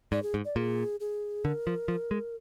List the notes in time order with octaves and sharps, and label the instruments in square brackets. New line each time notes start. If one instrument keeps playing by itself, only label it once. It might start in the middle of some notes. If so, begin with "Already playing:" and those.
[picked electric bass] G#2 [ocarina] D5
[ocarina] G#4
[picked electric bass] G#2
[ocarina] D5
[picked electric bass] A#2 [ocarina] G#4
[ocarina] G#4
[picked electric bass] D3 [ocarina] A#4
[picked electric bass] F3
F3
G#3